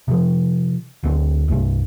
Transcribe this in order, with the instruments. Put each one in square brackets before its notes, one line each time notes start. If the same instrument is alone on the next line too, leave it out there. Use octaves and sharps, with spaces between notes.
[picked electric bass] C3 F3
D2 C4
C2 G2 C3